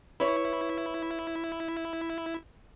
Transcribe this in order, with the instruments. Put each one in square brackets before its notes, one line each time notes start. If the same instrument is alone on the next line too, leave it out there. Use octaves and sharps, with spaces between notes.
[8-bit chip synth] E4 [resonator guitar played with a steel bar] B4 C#5